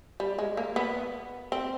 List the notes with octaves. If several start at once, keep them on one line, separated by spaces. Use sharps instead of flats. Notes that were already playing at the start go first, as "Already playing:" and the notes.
G3
G#3
A#3
B3
C4